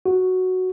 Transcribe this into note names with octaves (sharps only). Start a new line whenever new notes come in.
F#4